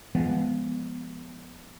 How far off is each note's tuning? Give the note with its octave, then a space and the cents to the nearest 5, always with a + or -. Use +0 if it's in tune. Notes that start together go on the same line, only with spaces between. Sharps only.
F3 -15 G#3 +0 B3 +0